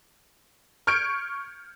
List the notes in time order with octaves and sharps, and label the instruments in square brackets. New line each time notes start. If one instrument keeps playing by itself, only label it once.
[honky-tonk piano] C#6 F6 G6 G#6 C#7 D7